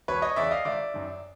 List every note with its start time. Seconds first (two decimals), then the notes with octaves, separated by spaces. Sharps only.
0.08 E1 B4 C#5
0.22 C#5 D#5
0.36 E2 C#3 D5 E5
0.51 D#5 F5
0.65 G#1 D5 E5
0.94 F#2 D#3